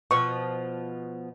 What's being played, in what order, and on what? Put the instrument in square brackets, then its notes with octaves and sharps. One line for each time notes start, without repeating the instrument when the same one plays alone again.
[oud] B2 F3 [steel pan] C#6